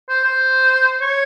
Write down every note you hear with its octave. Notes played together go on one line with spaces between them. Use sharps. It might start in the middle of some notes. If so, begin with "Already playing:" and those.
C5
C5
C#5